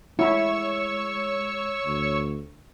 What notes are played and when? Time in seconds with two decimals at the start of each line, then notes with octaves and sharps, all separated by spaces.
0.19 G#3 E4 C#5 C#6 E6
1.86 D2